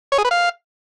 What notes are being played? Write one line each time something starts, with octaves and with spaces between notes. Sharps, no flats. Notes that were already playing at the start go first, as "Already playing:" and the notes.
C#5
G#4
B4
F5